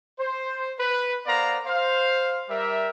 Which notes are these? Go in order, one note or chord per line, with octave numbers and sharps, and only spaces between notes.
C5
B4
B3 A#4 C5 D5 F5 A#5
C5 F5
G3 A#4 E5